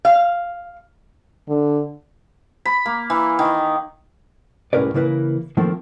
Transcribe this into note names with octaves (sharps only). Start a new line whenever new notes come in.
F5
D3
B5
A#3
E3
D#3
C2 A2 C#4 A#4 B4 D5
C#3 E3 A#3 B4
D#3 F3 A3 A#3 C4